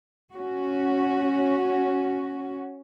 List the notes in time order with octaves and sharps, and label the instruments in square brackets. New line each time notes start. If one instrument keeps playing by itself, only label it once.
[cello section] C#4 F#4